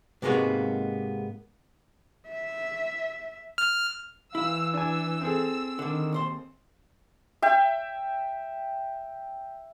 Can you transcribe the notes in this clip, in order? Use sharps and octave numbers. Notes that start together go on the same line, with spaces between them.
G#2 C3 G#3 A#3 B3 F#4
E5
F6
E3 E4 F5 E6
D4 G#5 E6
C4 G#4 A4
D3 D#3 D4
D#2 C5 C6
E5 G5